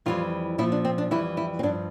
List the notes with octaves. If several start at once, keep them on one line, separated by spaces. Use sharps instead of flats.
F2 E3 G3 F4
A#2 F3 E4
D4
C4
D4
F2 E3 G3 E4
E4
C4
G2 F3 D4